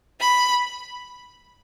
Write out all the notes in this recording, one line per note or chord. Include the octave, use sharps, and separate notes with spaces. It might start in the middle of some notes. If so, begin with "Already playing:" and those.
B5